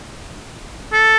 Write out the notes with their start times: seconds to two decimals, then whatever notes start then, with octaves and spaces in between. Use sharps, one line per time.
0.93 A4